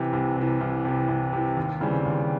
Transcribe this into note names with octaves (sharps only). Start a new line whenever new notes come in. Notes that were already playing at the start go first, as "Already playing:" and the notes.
Already playing: C3 E3
C2
C3 E3
C2
C3 E3
C2
C3 E3
D#2
C#3 E3 G3 C4
D#2